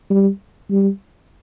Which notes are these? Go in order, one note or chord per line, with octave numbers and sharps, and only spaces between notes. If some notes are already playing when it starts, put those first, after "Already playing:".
G3
G3